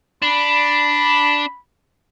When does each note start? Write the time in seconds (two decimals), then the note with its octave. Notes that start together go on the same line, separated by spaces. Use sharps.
0.22 D4 B5